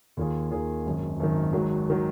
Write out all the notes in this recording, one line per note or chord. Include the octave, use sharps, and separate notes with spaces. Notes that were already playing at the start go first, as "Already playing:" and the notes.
D#2 D#3 A#3 F4 G#4
D#2 D#3 A#3 F4 G#4
G#1 F#2 D#3
G#1 F#2 D#3
G#1 G#2 D#3 F#3
D#3 F#3